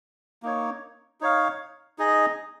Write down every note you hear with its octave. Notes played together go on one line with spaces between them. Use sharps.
A#3 D#4 C#5
D#4 C#5 F5
D#4 G#4 D#5